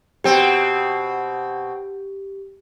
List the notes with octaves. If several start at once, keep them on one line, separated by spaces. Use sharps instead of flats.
B2 C4 G4